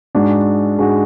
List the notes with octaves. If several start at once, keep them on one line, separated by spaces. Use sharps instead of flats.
G#2 G#3 D4 F#4
G#2 G#3 D4 F#4